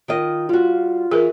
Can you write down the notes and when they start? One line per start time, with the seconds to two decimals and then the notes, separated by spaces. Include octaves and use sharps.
0.08 D#3 F4 D#5
0.49 G3 F4 F#4
1.11 E3 G#4 A#4 B4